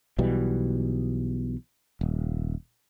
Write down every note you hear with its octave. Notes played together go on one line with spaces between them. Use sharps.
B1 B2 E3 G3
D#1